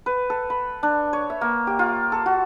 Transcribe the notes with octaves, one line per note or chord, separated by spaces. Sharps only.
B4
A4
B5
D4
C#5
E5
A#3
G4
F4
A4
F#4